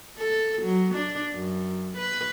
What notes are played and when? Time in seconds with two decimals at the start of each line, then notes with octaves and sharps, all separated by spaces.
0.18 A4
0.62 F#3
0.95 D4
1.34 F#2
1.97 B4